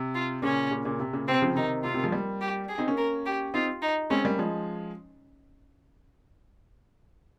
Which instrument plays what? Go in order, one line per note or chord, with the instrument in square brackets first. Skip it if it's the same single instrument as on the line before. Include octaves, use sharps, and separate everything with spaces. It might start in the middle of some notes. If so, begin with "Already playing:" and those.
Already playing: [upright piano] C3
[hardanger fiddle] F4
[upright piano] A#2 C#3 [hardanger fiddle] C#4
[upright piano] A#2 C#3
A#2 C#3
C3
A#2 C#3
[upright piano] C3 [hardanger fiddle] C4
[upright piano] C#3 F3
[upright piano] C3 D#3 [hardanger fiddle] D#4
[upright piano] C3 [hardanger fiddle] F4
[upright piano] C3 D#3
F3 G#3
G3 A#3
[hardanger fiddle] G4
G#4
[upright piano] C4 D#4
A#3 C#4
[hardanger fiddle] A#4
G4
[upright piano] C4 D#4 [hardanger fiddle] F4
[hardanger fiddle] D#4
[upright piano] G#3 C4 [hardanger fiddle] C#4
[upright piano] G3 A#3
F3 G#3